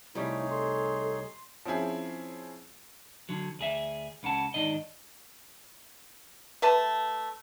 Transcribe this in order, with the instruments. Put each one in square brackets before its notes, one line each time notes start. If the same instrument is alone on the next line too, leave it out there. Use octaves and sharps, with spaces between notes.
[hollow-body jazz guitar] C2 G3 A3 [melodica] D#4 G#4 C#5 [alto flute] E4
[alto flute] A4 [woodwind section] C6
[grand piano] F3 C4 C#4 E4 G#4
[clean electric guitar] D3 F#3
D2 G#4 E5
C#2 C#3 F#5 A5
G#2 D#3 D4 D#5
[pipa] A3 B4 A5